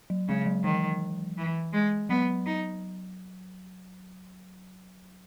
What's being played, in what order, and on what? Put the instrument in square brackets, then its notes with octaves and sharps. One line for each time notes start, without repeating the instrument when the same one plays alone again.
[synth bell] F#3
[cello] C#3 [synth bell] G#3
[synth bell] F#3
[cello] D#3 [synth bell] E3
[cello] E3
G#3
[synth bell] F#3 [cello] B3
[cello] D#4